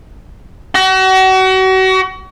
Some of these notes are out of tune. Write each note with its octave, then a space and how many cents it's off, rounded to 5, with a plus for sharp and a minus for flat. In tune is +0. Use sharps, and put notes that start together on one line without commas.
F#4 +35